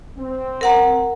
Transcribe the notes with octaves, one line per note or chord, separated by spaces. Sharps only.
C4
A#4 F#5 A#5